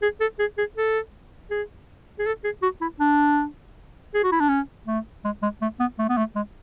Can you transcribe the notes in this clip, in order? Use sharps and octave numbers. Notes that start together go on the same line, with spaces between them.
G#4
A4
G#4
G#4
A4
G#4
G#4
A4
G#4
F#4
E4
D4
G#4
F#4
E4
D4
C#4
A3
G#3
G#3
A3
B3
A3
B3
A3
G#3